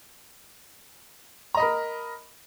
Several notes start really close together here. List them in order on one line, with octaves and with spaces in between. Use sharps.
A#5 D#5 B5 A#4